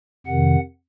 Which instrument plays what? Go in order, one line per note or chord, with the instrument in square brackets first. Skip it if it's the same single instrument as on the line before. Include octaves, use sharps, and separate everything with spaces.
[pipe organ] F2 C3 D#3 F#5